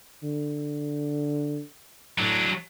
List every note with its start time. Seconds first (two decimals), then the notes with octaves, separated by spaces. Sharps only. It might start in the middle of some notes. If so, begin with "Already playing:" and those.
0.23 D3
2.19 A2 F#3 D4